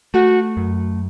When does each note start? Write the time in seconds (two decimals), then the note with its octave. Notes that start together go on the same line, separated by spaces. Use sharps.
0.14 A3 F#4
0.57 F#2